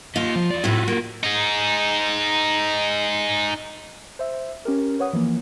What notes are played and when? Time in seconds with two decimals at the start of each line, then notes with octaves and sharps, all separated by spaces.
0.16 A#3 F4 D#5
0.36 F3
0.50 E2 D5
0.64 A2 C3 F4 F#4 B4
0.88 A#3
1.23 D#4 G#4
4.19 C5 E5
4.65 C#4 G4 A#4
4.99 B4 C#5 F#5 D#6
5.13 E3 F3 A#3